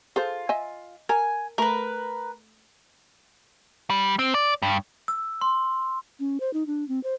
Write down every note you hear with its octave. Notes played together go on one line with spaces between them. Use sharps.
F4 G#4 A4 C5
D#5 E5 G#5
A#4 G#5
A3 A#4 B4
G3
C4
D5
G2
E6
C6
C#4
C5
D#4
D4
C4
C5